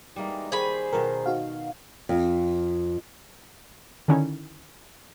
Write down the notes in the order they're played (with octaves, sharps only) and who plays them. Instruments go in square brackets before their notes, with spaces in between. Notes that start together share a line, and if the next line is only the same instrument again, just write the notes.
[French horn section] E3 G#3 D#4 [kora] G3 A#3
[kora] D#3 [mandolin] G#4 B5 [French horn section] C5
[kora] B2 D#3 [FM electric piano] A#4
[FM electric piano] D#4 F#4 F5
[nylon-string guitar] F2
[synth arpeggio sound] D3 D#3 C#4 D#4 E4